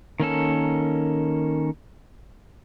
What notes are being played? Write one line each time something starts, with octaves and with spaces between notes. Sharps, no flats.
D#3 A#3 C#4 A4